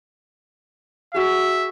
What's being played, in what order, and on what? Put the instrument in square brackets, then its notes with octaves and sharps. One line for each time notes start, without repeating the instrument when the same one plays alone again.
[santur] F#4 G#4 [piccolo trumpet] E5